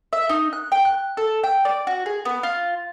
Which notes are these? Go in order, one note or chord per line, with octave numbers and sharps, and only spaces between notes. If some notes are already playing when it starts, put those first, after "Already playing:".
E5
D#4
F#6
G5
F#6
A4
G5
D5
F#4
G#4
B3
F4